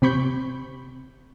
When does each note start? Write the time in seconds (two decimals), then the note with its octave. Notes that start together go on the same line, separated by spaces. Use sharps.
0.02 C3 C4 B5 C#6 G6